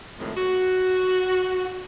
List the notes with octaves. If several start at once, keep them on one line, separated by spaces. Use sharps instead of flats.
F2 A2 D#3 G#3 A3
F#4